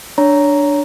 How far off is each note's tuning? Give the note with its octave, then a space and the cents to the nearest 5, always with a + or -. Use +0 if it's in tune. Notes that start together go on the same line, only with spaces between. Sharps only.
D4 +0 C#5 +20 A#5 +0